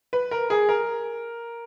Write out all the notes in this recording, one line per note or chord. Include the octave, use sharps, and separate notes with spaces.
B4
A#4
G#4
A#4